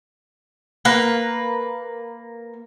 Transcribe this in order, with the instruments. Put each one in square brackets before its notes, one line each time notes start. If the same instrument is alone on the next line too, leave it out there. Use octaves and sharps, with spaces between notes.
[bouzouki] A#3 B4